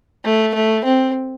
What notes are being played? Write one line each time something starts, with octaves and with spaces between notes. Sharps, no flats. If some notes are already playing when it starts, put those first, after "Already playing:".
A3
A3
C4